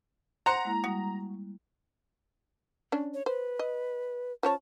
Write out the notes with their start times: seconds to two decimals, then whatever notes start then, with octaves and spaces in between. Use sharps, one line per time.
0.46 C5 F#5 A#5
0.65 G#3 A#3 E4
0.84 G3 F#4 D#6
2.92 C#4 D4
3.14 C#5
3.26 B4 C5
3.59 D#5
4.43 F3 C#4 C#5 A5